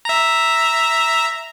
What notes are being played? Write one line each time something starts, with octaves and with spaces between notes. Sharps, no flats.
E5 A#5